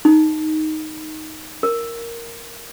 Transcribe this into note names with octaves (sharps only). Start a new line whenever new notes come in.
D#4
A#4